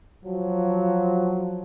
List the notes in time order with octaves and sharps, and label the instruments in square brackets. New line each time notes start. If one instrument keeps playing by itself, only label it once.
[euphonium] F3 [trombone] F#3